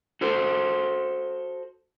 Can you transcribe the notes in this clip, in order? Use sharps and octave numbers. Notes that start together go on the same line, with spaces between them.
F#4 A4 C5